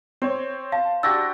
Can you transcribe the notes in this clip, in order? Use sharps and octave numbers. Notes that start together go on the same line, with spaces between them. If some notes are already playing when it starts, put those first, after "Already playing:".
C4 C5 C#5
F5 A5
D4 F#4 G4 E6 A6 A#6